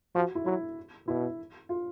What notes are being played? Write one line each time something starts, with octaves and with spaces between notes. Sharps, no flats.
F3 F#4
E4
F#3 E4
B2 E4
F4